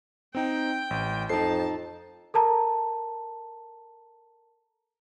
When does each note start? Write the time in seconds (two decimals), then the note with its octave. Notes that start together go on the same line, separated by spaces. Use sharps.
0.35 C4 D#4 G5
0.90 A1
1.29 F2 D#4 A5 C7
2.34 A4 A#4 A5 A#5